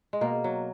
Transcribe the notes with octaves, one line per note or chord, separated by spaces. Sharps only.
G#3
B2 A#3
F#3